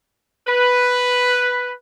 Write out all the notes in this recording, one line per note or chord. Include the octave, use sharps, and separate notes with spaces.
B4